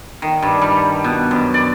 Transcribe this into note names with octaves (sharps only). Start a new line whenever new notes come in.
D#3
G2
G3
B2
F#2
D5